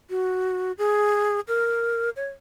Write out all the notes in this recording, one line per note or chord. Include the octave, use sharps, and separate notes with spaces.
F#4
G#4
A#4
C#5